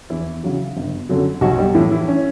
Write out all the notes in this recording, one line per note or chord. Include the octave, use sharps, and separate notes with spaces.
E2 E3 E4
C#3 F#3
G1
F#2 D3 F#3
B1 F#3 F#4
G3 G4
A2 E3 E4
E3 E4
C#4